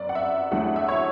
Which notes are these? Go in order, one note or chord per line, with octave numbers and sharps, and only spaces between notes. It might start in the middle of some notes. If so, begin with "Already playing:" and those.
Already playing: F#2 B3 D5
F#5
E5
E2 D3 F#3 A3 F#5
E5
C#5